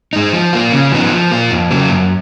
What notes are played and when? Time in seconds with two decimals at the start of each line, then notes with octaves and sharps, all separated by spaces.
0.13 G#3 D#4
0.33 F3
0.53 A#3 F4
0.72 C#3
0.92 F3 B3 D#4
1.12 F3
1.32 A#3 F4
1.50 F2
1.71 C#3 F#3 A#3
1.91 F#2